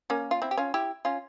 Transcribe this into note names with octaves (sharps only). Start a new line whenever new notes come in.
A#3 C#4
F4
C4 E4
G4
C#4 F4
E4 G4
C#4 F4